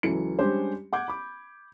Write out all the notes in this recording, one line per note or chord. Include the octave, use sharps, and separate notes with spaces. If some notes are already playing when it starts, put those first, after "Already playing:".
C#2 E3 F#3 A4 C#7
G3 G#3 C#4 D4 G4 C5
F#5 D6 G6 G#6
B5 D6